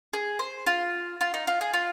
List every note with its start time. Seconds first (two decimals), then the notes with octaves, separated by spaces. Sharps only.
0.13 G#4
0.39 C5
0.66 F4
1.21 F4
1.34 D#4
1.47 F4
1.61 G#4
1.73 F4